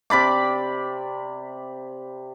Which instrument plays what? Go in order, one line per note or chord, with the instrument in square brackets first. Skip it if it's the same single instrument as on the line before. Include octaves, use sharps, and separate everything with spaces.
[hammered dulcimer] C3 D5 B5 D6